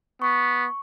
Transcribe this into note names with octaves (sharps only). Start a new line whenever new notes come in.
B3 C#6